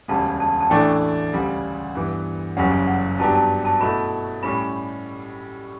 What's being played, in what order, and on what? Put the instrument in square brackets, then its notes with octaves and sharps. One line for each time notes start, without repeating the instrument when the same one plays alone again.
[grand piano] E1 D2 C#3 G3 [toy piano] A5
[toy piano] A5
A5
[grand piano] A1 A2 E3 A3 D4 [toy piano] G5
[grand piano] D2 C#3 G3
G2 E3 B3
[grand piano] F#1 F#2 C#3 G3 C#4 [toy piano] F#5
[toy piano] F#5
[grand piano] G2 F#3 B3 D4 G4 [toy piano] A5
[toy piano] A5
A5
[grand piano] B2 A3 E4 [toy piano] B5
[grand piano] A2 G3 C#4 [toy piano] B5